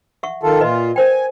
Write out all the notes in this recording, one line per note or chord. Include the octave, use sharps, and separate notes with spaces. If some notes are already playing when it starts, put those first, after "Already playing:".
E5 F#5 C#6
D#3 F4 A4
A#2 F4 B4 D#5 E5
A#4 C5 G5 G#5